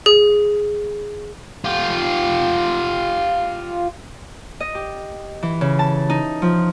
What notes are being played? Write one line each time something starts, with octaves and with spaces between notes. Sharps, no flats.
G#4
F4 G4
D#5
G4
E3
C#3
A5
D#4
F3